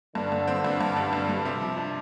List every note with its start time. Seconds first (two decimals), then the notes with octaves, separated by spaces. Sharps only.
0.15 G2 D3
0.32 G2
0.48 C4
0.65 G2
0.81 G2
0.96 G3
1.13 G2
1.29 G3
1.45 C3
1.62 F3
1.77 D4